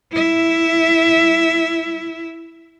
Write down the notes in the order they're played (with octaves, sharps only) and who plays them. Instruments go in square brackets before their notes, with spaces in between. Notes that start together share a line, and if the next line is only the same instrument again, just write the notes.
[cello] E4 E5